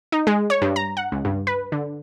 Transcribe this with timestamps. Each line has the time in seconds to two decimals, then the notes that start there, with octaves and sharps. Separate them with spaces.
0.12 D#4
0.27 G#3
0.50 C#5
0.62 G2
0.76 A#5
0.97 F#5
1.12 C#2
1.25 G2
1.47 B4
1.72 D3